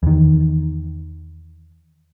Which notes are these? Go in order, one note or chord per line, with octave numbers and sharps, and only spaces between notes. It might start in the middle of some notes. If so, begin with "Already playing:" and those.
E2 D#3